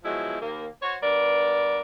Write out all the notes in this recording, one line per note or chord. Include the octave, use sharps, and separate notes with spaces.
B2 F3 F#3 G#3 E4
D#2 A#3
F#4 C5 C#5
G2 B3 A#4 D5